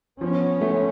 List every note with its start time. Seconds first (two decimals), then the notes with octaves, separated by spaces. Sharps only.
0.21 F3 B3 C#4
0.61 A3